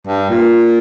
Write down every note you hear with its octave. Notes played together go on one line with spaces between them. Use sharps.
G2
A#2